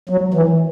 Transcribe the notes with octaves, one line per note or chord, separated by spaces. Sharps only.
F#3
E3